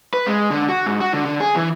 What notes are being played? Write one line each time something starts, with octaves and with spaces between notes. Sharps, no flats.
B4
G#3
D3
F#4
G#2
F#4
D3
D3
G#4
E3